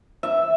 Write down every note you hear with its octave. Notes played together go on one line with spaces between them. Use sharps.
E5